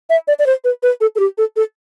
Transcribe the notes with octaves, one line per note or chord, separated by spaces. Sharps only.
E5
D5
D5
C5
B4
B4
A4
A4
G4
A4
A4